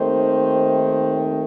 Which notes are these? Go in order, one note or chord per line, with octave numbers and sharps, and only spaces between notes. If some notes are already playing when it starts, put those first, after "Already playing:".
Already playing: D#2 D#3 A3 C4 D#4 C5